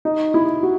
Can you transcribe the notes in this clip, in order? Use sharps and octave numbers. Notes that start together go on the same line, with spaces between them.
D#4
E4
F#4